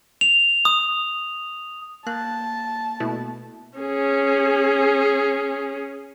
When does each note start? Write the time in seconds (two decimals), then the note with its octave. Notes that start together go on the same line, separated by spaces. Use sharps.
0.21 F7
0.65 D#6
2.07 A#3 A5 F#6
3.00 B2 A3 E4
3.78 C#4 G#4